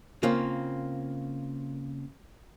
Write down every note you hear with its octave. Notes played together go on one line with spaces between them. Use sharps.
C#3 A#3 C4 F4